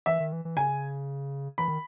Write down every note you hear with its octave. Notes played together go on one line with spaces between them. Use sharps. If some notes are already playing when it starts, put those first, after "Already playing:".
E3 E5
D#3
E3
E3
C#3 G#5
E3 B5
D#3